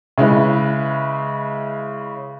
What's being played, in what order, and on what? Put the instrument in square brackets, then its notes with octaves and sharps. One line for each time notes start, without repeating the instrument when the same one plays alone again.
[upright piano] C#3 G#3 E4 B4